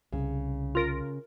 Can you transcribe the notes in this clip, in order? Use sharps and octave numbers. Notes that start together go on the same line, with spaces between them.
C2 C#3
F4 A#4